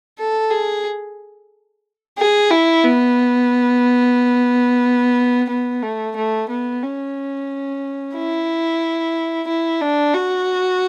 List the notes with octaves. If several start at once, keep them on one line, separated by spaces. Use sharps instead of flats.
A4
G#4
G#4
E4
B3
B3
A3
A3
B3
C#4
E4
E4
D4
F#4